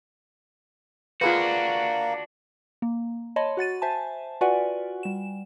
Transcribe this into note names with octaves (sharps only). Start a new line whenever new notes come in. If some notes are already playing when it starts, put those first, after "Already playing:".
A#3 D4 F4 F#4 G#4 B4
A#3
C#5 D#5 A5 B5 C6
F#4 F#5 A6 D#7
C5 E5 G#5 A5
F4 F#4 B4 D5 F#5 G#5
G3 E7